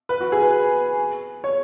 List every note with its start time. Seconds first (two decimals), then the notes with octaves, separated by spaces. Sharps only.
0.09 B4
0.21 F#4
0.32 G#4
0.42 B4
1.44 C#5